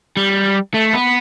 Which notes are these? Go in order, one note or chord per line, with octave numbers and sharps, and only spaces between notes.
G3
A3
B3